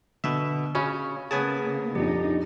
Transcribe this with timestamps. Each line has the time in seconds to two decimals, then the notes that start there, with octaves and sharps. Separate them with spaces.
0.24 B2 D3 E5
0.75 C#3 C#4 F#4 B5 C#6
1.31 C#3 A#3 B3 G#4 C#5 G#5 A5
1.95 A#1 F2 D4 D#4 G4